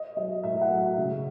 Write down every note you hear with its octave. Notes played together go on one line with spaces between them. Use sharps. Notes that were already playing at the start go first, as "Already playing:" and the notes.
Already playing: D#5
F#3 D#5
A2 E5
F#5
F#3
E5
C#3